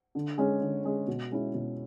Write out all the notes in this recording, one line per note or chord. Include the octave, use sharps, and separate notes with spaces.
D3
G#3 C#4
D3
G#3 C#4
B2
G#3 C#4 E4
B2